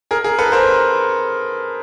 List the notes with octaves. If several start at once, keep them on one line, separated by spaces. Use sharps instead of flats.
G#4 A#4
G#4 A#4
A4 B4
A#4 C5